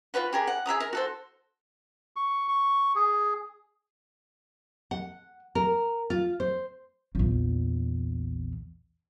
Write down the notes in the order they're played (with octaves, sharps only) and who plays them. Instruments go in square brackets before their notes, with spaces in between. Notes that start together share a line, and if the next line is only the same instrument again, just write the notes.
[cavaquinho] F4 F#4 B4 F#5
G4 G#4 A#4
F#5
G#4 E5 A#5 D#6
A#4 A#5
F#4 A4 C5
[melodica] C#6
C#6
G#4
[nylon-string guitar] F#5
A#4
F4
C5
[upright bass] A#1 E2